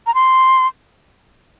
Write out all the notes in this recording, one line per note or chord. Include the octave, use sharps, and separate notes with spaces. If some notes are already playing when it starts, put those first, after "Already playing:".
A#5
C6